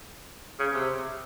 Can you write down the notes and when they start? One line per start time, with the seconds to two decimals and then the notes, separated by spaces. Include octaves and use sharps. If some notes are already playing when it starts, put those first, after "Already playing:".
0.59 C#3
0.74 C3